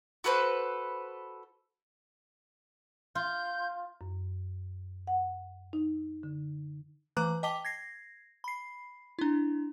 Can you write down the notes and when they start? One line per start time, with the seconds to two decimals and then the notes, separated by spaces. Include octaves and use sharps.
0.24 F#4 A4 B4 C5
3.15 F4 G6
4.01 F#2
5.07 F#5
5.73 D#4
6.23 D3
7.17 E3 A3 B4 A#5 D6 F#6
7.43 D#5 G5 A5 D6 B6 G7
7.65 G#6 A#6 C7
8.44 B5 C7
9.19 D4 E4